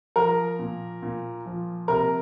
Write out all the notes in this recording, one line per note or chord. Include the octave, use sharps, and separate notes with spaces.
F3 A#4 A#5
A#2
A#2
F3
C3 A#4 A#5